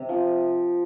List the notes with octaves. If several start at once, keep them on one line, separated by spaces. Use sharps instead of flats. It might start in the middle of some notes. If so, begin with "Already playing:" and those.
Already playing: C3
F3